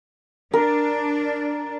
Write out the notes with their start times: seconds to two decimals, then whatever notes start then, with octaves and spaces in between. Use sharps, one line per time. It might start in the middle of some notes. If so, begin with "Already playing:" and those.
0.53 D4 A#4